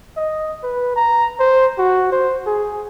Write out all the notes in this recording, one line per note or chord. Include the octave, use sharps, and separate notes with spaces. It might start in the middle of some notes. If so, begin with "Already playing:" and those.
D#5
B4
A#5
C5
F#4
C5
G#4